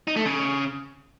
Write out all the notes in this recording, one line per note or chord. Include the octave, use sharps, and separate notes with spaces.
D#4
A3
C#3